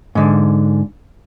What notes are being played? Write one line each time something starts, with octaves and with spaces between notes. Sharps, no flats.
G#2 D3